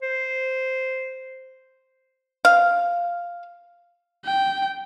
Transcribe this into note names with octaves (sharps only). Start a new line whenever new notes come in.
C5
F5
G5